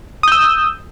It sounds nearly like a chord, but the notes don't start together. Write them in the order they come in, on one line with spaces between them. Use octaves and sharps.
D#6 G6 E6